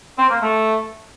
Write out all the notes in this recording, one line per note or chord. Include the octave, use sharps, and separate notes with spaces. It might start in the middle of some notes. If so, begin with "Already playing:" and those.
C4
A#3
A3